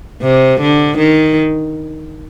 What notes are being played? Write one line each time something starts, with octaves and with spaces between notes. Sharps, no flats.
C3
D3
D#3